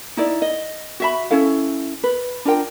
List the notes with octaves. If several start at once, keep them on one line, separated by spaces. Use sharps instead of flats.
D#4 E4 D5
D#5
F#4 E5 B5
C#4 E4 A4 F5
B4
D4 F4 A#4 G5